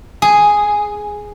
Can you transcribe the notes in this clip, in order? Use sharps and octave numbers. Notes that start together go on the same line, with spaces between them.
G#4